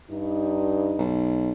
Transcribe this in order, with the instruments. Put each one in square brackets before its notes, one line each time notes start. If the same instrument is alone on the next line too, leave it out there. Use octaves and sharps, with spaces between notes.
[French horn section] G2 D#4
[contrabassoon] B1